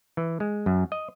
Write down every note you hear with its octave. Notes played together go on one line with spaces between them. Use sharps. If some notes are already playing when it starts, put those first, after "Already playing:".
E3
G#3
F#2
D#5